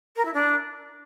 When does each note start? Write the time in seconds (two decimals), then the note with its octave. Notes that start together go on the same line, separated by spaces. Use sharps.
0.16 A#4
0.25 E4
0.34 D4